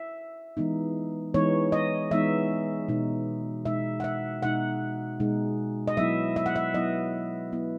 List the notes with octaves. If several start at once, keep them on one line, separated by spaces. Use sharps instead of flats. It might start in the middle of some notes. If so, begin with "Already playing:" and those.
Already playing: E5
E3 G#3 B3 D#4
E3 G#3 B3 D#4 C#5
D#5
E3 G#3 B3 D#4 E5
B2 G#3 D#4
B2 G#3 D#4 E5
F#5
E5
B2 G#3 D#4 F#5
B2 G#3 D#4
D#5
F#3 B3 E4 E5
E5
F#5
E5
F#3 B3 E4 D#5
F#3 B3 E4